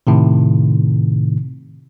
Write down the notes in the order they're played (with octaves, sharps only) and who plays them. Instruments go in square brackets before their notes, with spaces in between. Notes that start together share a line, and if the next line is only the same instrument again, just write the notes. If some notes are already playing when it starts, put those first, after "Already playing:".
[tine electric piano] A2 C3 D#3